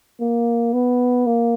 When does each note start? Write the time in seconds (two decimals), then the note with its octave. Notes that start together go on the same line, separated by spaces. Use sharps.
0.21 A#3
0.73 B3
1.26 A#3